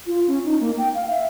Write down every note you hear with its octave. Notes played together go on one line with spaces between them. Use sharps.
F4
C#4
D#4
A#3
G5
F5
E5